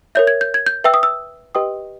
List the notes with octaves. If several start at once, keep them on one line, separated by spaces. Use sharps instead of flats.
A#4 C#5 E5 G6
G#6
G6
G#6
G6
B4 E5 G5 E6
D#6
E6
G4 B4 D#5 G5 D#6